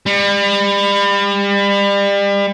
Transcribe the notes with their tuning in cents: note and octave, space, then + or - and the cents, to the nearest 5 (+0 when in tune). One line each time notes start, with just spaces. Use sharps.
G3 +35